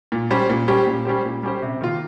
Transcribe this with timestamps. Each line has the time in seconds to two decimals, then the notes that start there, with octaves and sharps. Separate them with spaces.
0.12 A#2
0.31 G3 C#4 G4 C5
0.50 A#2
0.68 G3 C#4 G4 C5
0.86 A#2
1.05 G3 C#4 G4 C5
1.25 A#2
1.43 G3 C#4 G4 C5
1.62 C3
1.81 D#3 A#3 F4